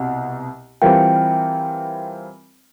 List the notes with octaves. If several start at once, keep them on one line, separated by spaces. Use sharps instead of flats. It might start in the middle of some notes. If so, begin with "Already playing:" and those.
Already playing: C2 B2 F#5
E3 G3 C4 F4 A#4 G5